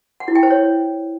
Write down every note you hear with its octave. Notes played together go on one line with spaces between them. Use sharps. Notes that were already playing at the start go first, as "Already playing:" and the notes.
F#5
E4
G5
C5
C#5